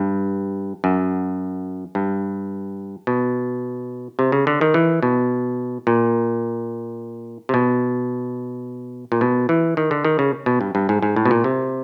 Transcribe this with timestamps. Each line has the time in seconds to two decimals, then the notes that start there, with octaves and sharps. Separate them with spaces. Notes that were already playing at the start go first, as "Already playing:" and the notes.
Already playing: G2
0.84 F#2
1.95 G2
3.07 B2
4.19 C3
4.32 C#3
4.47 D3
4.61 D#3
4.74 E3
5.03 B2
5.87 A#2
7.49 C3
7.54 B2
9.12 A#2
9.21 B2
9.49 E3
9.77 D#3
9.91 D3
10.05 D#3
10.19 C#3
10.46 B2
10.61 G2
10.75 G2
10.89 G#2
11.02 G#2
11.16 A2
11.25 B2
11.31 A#2
11.44 C3